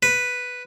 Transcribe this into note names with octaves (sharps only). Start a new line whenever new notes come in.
B4